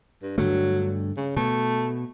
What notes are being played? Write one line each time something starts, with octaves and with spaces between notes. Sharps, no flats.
G2
G2 D3 F#3 A3
C#3
B2 A3